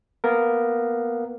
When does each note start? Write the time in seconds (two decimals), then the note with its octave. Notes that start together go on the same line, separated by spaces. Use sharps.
0.24 A#3 B3 A#4